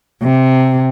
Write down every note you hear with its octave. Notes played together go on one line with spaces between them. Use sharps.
C3